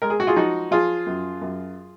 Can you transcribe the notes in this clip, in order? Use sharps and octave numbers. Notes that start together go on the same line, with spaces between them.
G#3 A#4
G#4
F#4
F4 G#4
F3 D#4 F#4
F3 F4 G#4
F#2
F#2